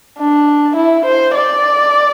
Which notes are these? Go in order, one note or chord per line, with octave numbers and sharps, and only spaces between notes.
D4
E4
C5
D5